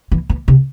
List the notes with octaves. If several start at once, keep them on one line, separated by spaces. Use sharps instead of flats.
E3
E3
C3